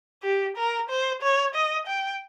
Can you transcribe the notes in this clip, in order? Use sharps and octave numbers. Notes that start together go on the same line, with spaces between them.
G4
A#4
C5
C#5
D#5
G5